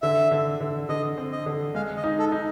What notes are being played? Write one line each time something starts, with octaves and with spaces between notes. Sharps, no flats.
D3 E5
D3
D3
D3 D#5
C4
D#5
D3
G#3 F5
D#5
D#4
A4
D#4